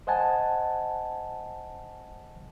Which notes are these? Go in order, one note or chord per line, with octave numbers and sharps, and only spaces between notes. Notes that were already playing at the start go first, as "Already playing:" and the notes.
C5 D#5 F#5 G#5 A5